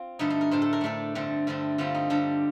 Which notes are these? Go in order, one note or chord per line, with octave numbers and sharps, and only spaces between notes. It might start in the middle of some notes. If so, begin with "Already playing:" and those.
Already playing: C4 F4
G2 D3 A3 D#4
D#4
A#4
A2 A3 D4 C5
A4
A#4
A2 A3 D4 A4
G2 D3 A3 C4
G2 D3 A3 C4
D3 G3 C4 F4
D#4
D3 G3 C4 D4